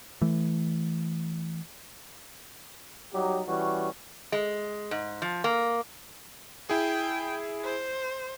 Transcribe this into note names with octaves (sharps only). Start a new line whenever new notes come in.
E3 A3
F#3 G3 D#4 G4
E3 G3 C#4 F#4
G#3
G#2
F3
A#3
E4 G#4 G5
C5